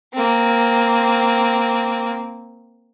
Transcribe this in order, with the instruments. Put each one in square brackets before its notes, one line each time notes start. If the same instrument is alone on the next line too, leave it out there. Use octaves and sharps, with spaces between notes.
[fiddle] A#3 C4